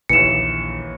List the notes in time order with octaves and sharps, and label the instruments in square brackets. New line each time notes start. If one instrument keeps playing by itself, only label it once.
[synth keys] A#1 [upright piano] D#2 E3 [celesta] C#7 E7